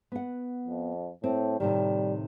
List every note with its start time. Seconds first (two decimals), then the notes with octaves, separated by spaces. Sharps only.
0.12 B3 F#5
0.67 F2
1.24 A2 C4
1.60 A2 C3 D#3 G3